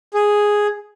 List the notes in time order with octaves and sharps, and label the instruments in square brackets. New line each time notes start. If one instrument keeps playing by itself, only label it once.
[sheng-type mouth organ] G#4